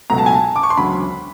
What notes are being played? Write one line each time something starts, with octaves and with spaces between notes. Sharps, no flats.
C#2 B2 F#3 A3 A#5
A5
G#5
A5
D6
C#6
C6
E1 D2 C#3 F#3 B5